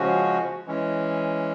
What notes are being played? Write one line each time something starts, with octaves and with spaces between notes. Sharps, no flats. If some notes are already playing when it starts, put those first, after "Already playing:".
Already playing: C#3 F3 G#3 C#4 F#4
E3 G#3 C#4